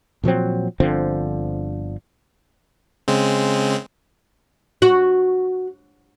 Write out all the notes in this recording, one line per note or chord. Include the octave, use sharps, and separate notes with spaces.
A#2 F3 F#3 C4
G1 D3 F3 C4
C#3 G#3 C4
F#4